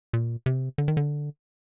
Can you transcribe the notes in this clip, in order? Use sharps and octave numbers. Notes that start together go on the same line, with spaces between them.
A#2
C3
D3
D#3
D3